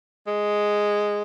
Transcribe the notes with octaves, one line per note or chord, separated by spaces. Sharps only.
G#3